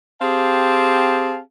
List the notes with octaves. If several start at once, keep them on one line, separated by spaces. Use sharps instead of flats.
C4 G4 G#4 F5 A5